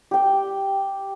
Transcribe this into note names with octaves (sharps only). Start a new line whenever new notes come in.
G4 G5